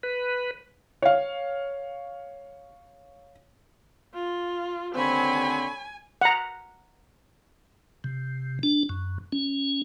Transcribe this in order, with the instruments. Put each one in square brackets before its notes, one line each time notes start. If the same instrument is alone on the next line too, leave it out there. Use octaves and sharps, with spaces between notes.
[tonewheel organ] B4
[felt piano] C#5 F5
[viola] F4
[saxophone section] D#2 D3 C4 [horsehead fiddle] C#5 B5 [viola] G#5
[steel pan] F#5 A#5
[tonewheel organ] C3
D4
F#2
C#4